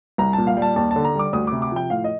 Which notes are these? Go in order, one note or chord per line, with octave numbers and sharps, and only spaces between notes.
C2 A#5
A#2 A5
F5
G3
A5
D#2 A5
A5
D3
A#5
G3 D6
D2 D#6
C3 D6
D6
F3 G5
A2 F5
D#5